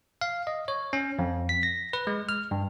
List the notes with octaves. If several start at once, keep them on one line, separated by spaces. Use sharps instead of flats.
F5
D#5
C#5
C#4
F2
B6
A#6
B4
G#3
F6
G2